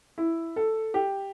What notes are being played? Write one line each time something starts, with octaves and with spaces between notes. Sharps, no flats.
E4
A4
G4